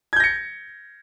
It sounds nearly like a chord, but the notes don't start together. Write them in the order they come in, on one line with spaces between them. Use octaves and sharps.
G#6 G6 A#6 C#7